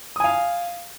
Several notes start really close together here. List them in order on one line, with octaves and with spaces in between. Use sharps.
D#6 G#5 F5